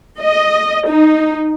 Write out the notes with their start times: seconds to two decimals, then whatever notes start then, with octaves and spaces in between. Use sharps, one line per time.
0.22 D#5
0.88 D#4